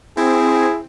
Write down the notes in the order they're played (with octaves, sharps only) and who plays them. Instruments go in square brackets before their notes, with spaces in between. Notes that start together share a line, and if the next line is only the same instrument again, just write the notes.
[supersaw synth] C4 [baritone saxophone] E4 [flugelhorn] G#4